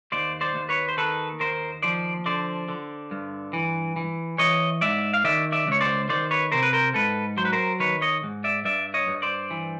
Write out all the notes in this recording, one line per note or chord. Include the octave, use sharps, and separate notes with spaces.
D#2 C5 D5
C5 D5
D#2
B4 C#5
C5
D#3 A4 B4
D#2 A#4 C5
F3 C5 D5
D3 C5 D5
D3
G2
E3
E3
E3 C#5 D#5
G#2 D5 E5
F5
D#3 D5 E5
D5 E5
C#2 C#5
C5 D5
D#3 C5 D5
B4 C#5
C3 A#4 C5
B4
A#4 C5
G#2 A4 B4
F#3 C5
B4
A#4 C5
D#3 B4 C#5
C#5 D#5
G#2
D5 E5
G2 D5 E5
C#5 D#5
G2
C5 D5
E3